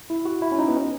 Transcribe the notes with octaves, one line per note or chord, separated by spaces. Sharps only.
E4
F#4
E4
C#4
D#4
B3
C#4